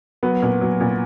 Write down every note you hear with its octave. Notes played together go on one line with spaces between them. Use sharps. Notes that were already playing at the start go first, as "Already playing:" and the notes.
F#3 B3
A#2
F#3
A#2